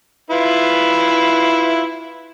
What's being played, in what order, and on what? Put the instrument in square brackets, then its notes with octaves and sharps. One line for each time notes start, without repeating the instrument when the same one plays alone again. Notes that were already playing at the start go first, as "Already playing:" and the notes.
[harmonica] E4 F4 B4